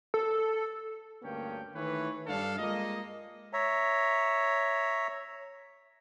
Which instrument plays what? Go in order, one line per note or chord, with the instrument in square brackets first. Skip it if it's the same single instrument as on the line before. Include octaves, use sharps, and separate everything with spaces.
[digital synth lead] A4
[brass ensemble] D2 G2 A#3 C#4 G5
D#3 E3 A3 B4 C#5
G2 G3 D4 A4 F5
G#3 A#3 F4 D#5
[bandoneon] C#5 E5 A#5